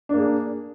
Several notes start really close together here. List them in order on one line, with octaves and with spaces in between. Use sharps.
D4 A#3 G#4